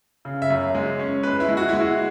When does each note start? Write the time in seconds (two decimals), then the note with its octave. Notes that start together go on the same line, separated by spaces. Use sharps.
0.25 C#3
0.42 E5
0.50 F#2
0.75 G#3
0.99 C#4
1.23 G#3 B4
1.40 E4
1.49 G#3
1.57 F#4
1.69 G#3 E4
1.80 F#4